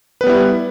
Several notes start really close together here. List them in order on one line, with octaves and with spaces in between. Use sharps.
B4 B3 G3 E4